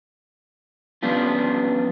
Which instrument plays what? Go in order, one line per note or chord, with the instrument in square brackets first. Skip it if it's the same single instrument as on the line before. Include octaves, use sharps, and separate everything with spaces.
[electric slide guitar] F3 G3 B3 C#4 D4 F4